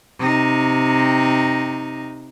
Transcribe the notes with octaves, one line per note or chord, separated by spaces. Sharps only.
C3 D#4